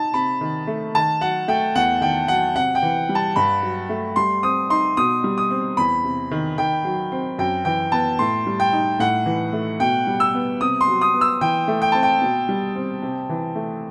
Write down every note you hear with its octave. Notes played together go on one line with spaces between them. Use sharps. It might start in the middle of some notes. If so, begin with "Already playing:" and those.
Already playing: D#4 A5
C3 B5
D#3
A3
D#3 A5
F#3 F#5
A3 G5
E2 F#5
D#3 G5
F#3 F#5
C3 F#5
G5
E3
G3
A5
G2 B5
F#3
A3
G3 C6
C4 D#6
D#4 C6
B2 D#6
G3
D#6
C4
E2 B5
C3
D#3
D#3 G5
F#3
C4
F#2 G5
E3 G5
B3 A5
A2 C6
G3
G5
D#4
A2 F#5
E3
A3
B2 G5
G3
E6
B3
C3 D#6
C6
F#3
D#6
B3
E6
E3 G5
A3
G5
C4 A5
G5
B2
G3
C4
C3
E3
A3